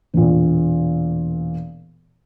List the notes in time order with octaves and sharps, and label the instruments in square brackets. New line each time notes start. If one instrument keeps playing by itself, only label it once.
[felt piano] E1 A#2